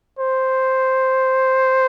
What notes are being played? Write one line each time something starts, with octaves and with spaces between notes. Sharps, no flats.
C5